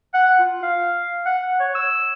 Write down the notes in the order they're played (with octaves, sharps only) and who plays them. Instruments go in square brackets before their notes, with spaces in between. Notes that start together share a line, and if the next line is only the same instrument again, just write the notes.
[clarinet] F#5
F4
F5
F#5
C#5
E6